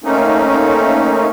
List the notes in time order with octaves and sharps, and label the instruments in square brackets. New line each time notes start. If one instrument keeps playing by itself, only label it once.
[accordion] A3 A#3 C4 C#4 D#4